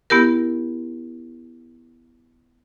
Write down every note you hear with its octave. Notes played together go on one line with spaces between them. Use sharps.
B3 E4 G4 A#4